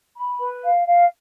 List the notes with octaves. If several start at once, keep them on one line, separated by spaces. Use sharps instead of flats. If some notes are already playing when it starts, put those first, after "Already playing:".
B5
B4
F5
F5